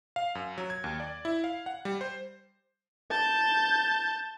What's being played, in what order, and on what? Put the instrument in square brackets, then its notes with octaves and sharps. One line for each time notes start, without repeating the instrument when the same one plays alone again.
[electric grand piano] F5
F#2
F#3
G#6
D#2
D5
E4
F5
F#5
G3
C5
[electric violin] A5 G6